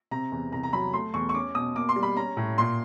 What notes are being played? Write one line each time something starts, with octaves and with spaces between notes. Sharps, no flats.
C3 A#5
E2
C2 A#5
A#5
F#3 B5
A3 C6
E2 C#6
C#6
C#4 D6
B2 D#6
A#3 D6
C6
G3
B5
C#4 A#5
A2
A#2 C6